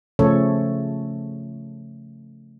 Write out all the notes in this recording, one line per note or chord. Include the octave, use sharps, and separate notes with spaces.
C#3 F3 A3 C#4 A4 C#5